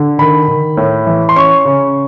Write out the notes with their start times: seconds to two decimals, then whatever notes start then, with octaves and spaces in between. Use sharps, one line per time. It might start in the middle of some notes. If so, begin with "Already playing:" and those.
Already playing: D3
0.19 D#3 B5
0.48 D#3
0.77 A2
1.07 E3
1.29 C6
1.36 C#4 C#6
1.65 C#3